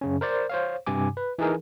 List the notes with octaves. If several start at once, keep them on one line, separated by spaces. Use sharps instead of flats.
F#2 C#3 C#4
A#4 C5 D5
C5 C#5 F5
G2 C3 G#5 D6
B4
E3 D#4 G#4 A#4